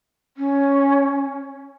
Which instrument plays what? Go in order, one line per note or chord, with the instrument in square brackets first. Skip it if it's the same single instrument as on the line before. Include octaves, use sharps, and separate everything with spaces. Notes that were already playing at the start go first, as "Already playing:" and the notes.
[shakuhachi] C#4